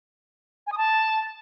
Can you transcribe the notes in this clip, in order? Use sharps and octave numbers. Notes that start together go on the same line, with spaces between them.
G#5
D#6
A5